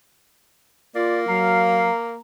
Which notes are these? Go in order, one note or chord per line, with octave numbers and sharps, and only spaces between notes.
A#3 F4 D5
F#3 F5 A#5